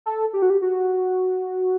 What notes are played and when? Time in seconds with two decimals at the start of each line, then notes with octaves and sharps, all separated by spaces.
0.06 A4
0.33 G4
0.42 F#4
0.50 G4
0.62 F#4